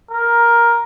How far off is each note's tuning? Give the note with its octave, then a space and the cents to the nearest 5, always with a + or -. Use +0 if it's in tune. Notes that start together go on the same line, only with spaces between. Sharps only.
A#4 +10